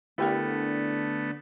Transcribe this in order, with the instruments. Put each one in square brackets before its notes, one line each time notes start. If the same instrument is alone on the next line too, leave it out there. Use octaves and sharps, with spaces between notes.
[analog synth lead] D3 [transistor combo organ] A3 B3 [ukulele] E4 G4 A#4